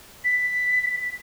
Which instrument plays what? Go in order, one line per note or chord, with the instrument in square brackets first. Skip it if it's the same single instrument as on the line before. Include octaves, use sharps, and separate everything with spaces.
[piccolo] B6